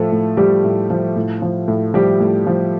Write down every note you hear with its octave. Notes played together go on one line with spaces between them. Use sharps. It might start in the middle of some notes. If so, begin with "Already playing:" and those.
Already playing: A2 F3 A3 A4
A2
F3 G3 G4
A2
F3
A2
F3
A2
F3 G3 G4
A2
F3